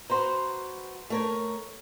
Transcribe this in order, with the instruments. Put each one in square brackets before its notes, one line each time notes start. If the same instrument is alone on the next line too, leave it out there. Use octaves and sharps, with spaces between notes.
[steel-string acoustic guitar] F#4 B4 C5 [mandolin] A#5 C6
[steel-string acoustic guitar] A3 A#4 C#5